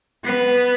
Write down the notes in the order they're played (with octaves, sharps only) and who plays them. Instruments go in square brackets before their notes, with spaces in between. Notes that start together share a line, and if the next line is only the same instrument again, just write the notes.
[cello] B3